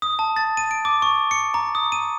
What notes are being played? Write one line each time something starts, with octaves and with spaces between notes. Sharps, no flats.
D#6
A5
A6
D#7
D7
D6
C#6
C#7
A#5
D#6
D#7